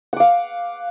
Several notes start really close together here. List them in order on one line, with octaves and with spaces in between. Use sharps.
F#5 D6 F5